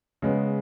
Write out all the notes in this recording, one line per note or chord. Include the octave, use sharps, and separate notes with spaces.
C#3 G#3 B3